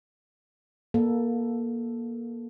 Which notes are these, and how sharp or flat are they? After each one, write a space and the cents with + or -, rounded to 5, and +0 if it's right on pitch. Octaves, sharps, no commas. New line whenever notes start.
A#3 +20 A4 +0